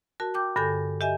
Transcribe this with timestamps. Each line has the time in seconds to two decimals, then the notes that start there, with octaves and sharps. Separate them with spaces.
0.20 F#4 A#4 A5
0.34 G5 D6 G6
0.56 G2 D3 A4 G#5 G6 A#6
1.01 G4 D#5 E5 G#5